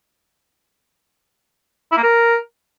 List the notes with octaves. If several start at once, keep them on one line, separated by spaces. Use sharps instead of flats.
E4
A#3
A#4